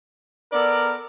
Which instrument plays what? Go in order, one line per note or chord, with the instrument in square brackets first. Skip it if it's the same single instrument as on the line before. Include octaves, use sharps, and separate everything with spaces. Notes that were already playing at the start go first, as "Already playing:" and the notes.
[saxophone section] B3 A4 D5 [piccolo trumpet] A#4